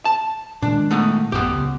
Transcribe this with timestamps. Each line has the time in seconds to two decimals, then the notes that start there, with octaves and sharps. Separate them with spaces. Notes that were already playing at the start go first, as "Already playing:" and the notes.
0.05 A5
0.62 A#2 D#3 G#3 D4
0.91 A3 B3 D#4
1.32 A1 F#2 B3 G4
1.53 C#2